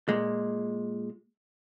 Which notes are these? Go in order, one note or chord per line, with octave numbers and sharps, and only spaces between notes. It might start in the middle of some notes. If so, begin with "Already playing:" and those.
A#2 G#3